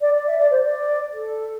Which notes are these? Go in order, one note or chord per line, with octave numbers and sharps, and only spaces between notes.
D5
D5
E5
D5
C5
D5
A4